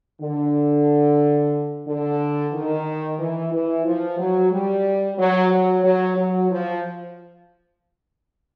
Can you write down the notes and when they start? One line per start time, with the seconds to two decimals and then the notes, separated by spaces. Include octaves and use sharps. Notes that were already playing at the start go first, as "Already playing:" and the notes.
0.22 D3
1.87 D3
2.53 D#3
3.19 E3
3.52 E3
3.85 F3
4.19 F#3
4.52 G3
5.18 F#3
5.51 F#3
5.84 F#3
6.17 F#3
6.50 F3